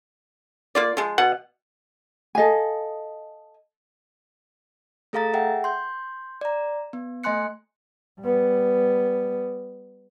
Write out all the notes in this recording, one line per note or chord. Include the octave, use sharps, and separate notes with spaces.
A#3 F4 D5
F3 G#3
B2 F#5
A4 D#5 F5 G#5
A3 G#4 A4 F5 A#5 A6
G#4 E5 F#5 G5
C6 G6
D5 A#5
B3
A3 D#5 G#5 C6 F#6 C#7
G3 B3